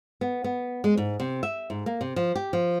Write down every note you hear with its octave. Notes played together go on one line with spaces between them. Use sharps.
B3
B3
G#3
G#2
C3
E5
G#2
A#3
C3
F3
G4
F3